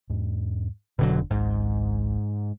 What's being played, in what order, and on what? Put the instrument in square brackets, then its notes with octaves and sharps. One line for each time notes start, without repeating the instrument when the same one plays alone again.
[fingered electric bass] E2 G#2 G#3
[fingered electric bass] F1 [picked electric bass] B2 D3 F#3
[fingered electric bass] G#1 C#2 G#3 [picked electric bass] G#2